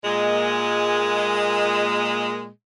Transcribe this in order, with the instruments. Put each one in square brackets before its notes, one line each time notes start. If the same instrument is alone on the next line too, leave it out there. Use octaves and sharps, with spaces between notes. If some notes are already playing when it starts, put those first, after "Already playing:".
[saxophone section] A#2 G#3